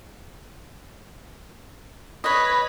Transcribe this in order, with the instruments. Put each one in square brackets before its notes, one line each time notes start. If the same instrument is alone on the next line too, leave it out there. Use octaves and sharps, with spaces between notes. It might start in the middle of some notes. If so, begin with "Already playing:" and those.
[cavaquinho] B4 D#5 [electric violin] C#5 B5